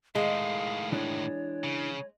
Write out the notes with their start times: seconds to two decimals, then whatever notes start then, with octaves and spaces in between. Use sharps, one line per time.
0.15 A2 D#3 G#3 F5
0.92 E3 D4 C#5
1.64 C#3